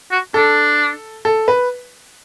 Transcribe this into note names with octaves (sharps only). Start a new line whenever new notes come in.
F#4
D4 A4
A4
B4